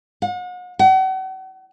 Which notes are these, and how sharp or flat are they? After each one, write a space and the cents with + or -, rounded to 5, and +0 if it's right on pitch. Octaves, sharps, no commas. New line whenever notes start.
F#5 -40
F#5 +40